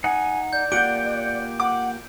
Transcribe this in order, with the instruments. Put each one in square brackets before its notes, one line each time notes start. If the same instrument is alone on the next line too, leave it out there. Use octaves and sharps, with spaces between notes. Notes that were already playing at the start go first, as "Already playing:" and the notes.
[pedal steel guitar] D#4 F#5 [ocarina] G#5
[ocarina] D5 [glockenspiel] G6
[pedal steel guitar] A#3 F4 G4 [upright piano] F#5 G6 [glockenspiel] D7
[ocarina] F#5 [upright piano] D6